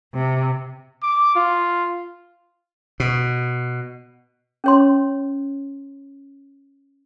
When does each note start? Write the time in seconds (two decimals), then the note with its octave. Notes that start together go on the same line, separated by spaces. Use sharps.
0.14 C3
1.03 D6
1.36 F4
3.00 B2
4.64 C#4 C#5 C6